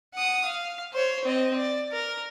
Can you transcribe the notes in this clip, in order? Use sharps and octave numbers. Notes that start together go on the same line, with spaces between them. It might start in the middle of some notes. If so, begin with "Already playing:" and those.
F#5 D#6
F5
C5 C#5
C4 D#5
D5
A#4